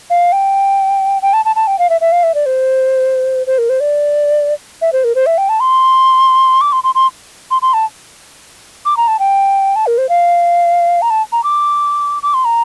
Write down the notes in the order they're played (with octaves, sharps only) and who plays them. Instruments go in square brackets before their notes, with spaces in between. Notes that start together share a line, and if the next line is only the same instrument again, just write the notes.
[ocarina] F5
G5
G5
A5
A5
A5
G5
F5
E5
E5
F5
E5
D5
C5
C5
A#4
C5
D5
E5
C5
A#4
C5
E5
G5
A5
C6
D6
C6
C6
C6
C6
C6
A5
D6
A#5
A5
G5
A5
A#4
C5
F5
A#5
A5
A#5
D6
D6
C6
A#5